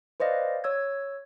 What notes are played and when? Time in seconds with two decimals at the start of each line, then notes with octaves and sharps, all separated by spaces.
0.20 B4 C5 D5 D#5 F5
0.64 C#5 E6 G#6